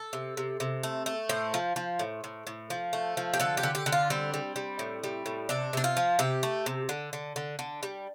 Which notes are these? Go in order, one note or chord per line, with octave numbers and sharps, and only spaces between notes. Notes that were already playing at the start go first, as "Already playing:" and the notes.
Already playing: A4
C3
C3
C3
A3
A3
A2 C5
F3
F3
A2
A2
A2
F3
A3
F3
G4
D3 A4
G4
D3
G4
D3
F4
G3 C4
G3
G3
A2
G3
A2
C3 D4
C3 D4
F4
F3
C3 G4
A3
C3
D3
D3
D3
D3
G3